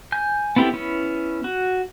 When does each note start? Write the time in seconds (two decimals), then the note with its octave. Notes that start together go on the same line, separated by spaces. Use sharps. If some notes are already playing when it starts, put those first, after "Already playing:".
0.12 G#5 G6
0.56 B3 C4 E4 G4 A4
0.74 B3 C#4 E4
1.44 F#4